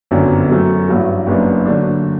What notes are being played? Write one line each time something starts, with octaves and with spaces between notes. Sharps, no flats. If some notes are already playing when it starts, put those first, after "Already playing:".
G1 F#2 D3 F#3 C4
F#2 F#3 A3
A1 G2 F#3
F#1 F#2 F#3 B3 D4
D3 F#3 A3 D4